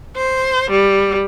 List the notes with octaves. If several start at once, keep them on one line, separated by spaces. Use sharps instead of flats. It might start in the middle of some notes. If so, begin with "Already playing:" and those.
C5
G3